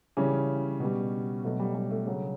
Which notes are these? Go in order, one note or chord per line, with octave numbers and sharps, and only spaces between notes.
C#3 E3 G3 C#4
B2 G3
B2 F#3 A3
G3
G3
A3
C#3 F#3